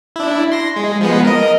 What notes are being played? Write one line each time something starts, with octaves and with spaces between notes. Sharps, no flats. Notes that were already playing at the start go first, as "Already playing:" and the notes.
D4 E4
C6 A#6
G#3
F3 G#3 B3
A#4 D#5